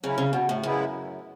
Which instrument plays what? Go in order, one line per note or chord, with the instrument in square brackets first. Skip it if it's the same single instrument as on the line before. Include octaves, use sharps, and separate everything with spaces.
[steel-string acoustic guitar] C#3 [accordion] F#3 C#4 E4
[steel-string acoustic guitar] C#3
B2
A2
[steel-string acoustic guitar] F#2 [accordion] C#3 G#3 B3 E4